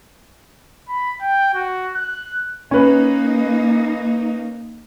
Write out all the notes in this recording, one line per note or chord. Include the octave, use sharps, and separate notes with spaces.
B5
G5
F#4
F#6
A#3 C#4 D#4 B4